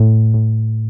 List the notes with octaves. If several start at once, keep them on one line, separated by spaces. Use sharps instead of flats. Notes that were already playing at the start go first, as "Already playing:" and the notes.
Already playing: A2
A2